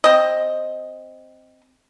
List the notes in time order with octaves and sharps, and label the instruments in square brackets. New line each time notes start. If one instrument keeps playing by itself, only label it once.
[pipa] C4 D#5